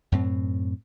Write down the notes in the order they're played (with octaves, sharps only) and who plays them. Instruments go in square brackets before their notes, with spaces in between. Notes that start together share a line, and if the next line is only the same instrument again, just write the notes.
[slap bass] F#2 A2 C4